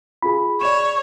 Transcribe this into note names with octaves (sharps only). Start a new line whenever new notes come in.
F4 G#4 B5
C#5 D5 E7